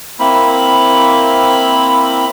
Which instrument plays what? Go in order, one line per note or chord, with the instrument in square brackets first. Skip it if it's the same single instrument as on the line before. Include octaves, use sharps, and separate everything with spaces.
[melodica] A#3 C4 E4 B5